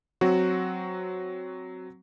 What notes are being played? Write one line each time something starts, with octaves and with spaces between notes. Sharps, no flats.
F#3 C4 F#4